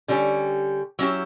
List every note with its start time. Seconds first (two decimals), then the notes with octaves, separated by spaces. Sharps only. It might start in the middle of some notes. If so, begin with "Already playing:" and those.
0.08 D3 G3 C#4 E4 G4
0.99 F#3 C#4 E4 G4